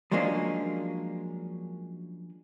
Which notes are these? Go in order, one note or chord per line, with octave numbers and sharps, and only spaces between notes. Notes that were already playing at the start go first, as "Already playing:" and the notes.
F3 F#3 G#3 A#3 C#4 D4